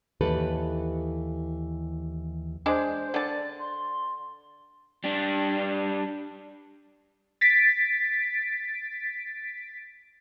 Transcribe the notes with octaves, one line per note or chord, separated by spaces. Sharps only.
D#2 E3 G4 A4 B4
G#3 D4 C5
D3 D5 A5
C6
G3 D4
A6 B6 D7